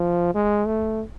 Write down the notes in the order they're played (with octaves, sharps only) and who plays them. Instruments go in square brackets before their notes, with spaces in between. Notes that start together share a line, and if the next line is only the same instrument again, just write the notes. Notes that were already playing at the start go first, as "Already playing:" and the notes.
Already playing: [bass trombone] F3
G#3
A3